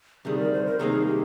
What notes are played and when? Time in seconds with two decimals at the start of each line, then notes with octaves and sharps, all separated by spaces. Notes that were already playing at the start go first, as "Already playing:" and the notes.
0.25 D2 C3 D#3 G3 G#4
0.39 A#4
0.53 C5
0.66 A#4
0.79 C2 C3 D#3 G3 A#3 G#4
1.07 G4